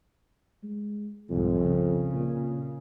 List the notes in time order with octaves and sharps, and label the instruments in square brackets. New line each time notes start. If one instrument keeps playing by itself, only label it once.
[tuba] G#3
[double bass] C2 G#2 [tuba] F2
[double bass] C#3
[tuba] A#2